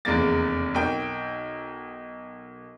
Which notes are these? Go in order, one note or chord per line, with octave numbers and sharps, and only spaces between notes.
F1 E2 C#3 A#3 A6
B1 A#4 G5